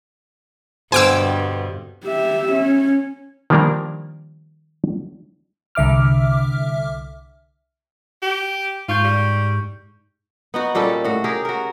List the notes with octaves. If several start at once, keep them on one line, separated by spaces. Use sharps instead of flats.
G2 B2 D3 C4 C5 G#5 D6 E6
G4 E5
C#4
D#3 F3 G3 A#3 D4 A#4
C2 D3 E5 D6 F6
G4
G#2 F4 C#6 G6
G3
B3 D#4 F#4
A#2 G3 C#4 A4
A2 F#4
G4 G#4 A#4
F#4 A#4